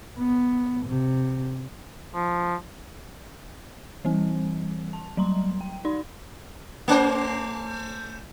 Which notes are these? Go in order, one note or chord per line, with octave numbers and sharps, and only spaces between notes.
B3
C3
F3
E3 G3 C4
A5
F#3 G3 A#5 C6
G5
D#4 D5 C6
A3 C#4 C5